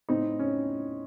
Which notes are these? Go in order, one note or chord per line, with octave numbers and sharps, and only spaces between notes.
A2 C4 D#4
C#4